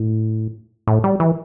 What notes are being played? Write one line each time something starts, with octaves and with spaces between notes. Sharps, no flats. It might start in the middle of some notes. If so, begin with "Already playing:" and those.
Already playing: A2
A2
G3
E3